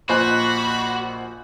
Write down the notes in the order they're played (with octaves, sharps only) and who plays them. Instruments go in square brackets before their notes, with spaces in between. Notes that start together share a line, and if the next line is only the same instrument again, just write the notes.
[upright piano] A#1 G#5 F#6 [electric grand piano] F4 C5 D#5 [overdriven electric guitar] F#4 [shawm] B5